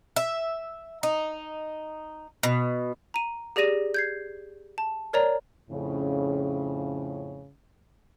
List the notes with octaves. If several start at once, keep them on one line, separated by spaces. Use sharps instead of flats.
E5
D#4
B2
A#5 D#7
G4 G#4 D5 A#6 D#7 E7
G6 G#6 C7
A5
A#4 C#5 D5 A#5
F2 A2 C#3